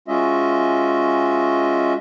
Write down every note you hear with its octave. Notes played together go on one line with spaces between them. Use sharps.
G#3 C#4 F4 F#4 D#5 E5